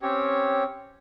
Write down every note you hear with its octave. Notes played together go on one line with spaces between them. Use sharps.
C4 C#4 G4 C#5